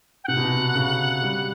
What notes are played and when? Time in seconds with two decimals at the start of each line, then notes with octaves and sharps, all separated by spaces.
0.24 G5
0.28 C3 F#5
0.37 B2
0.44 C3
0.75 C#3
1.22 G3